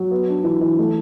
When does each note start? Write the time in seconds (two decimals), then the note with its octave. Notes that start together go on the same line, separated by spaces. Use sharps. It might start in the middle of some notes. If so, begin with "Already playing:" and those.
Already playing: F#3
0.11 B3
0.28 D4
0.44 E3
0.61 E3
0.79 A3